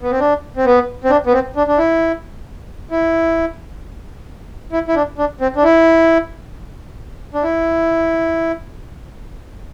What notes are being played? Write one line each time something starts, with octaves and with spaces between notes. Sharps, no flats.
B3
C4
D4
C4
B3
C4
D4
B3
C4
D4
D4
E4
E4
E4
E4
D4
D4
C4
D4
E4
D4
E4